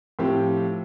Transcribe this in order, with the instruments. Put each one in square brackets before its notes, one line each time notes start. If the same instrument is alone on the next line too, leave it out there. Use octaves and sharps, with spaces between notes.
[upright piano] A2 F3 C4 G4